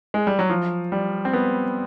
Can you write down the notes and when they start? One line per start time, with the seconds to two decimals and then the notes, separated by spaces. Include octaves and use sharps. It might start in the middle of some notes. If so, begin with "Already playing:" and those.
0.14 G#3
0.27 G3
0.39 F#3
0.50 F3
0.92 G3
1.25 C4
1.33 B3